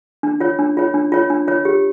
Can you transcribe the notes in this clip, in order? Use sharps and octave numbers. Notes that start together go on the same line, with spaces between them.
D4
F4 C#5
D4
F4 C#5
D4
F4 C#5
D4
F4 C#5
G4